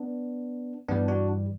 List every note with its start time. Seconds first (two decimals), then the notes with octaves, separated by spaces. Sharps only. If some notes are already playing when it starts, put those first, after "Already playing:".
Already playing: B3 D4
0.88 G2 E3 G3 B3 D4
1.08 D4 F#4